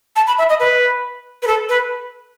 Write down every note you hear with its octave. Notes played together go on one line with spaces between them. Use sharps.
A5
B5
E5
D#5
B4
B4
A4
B4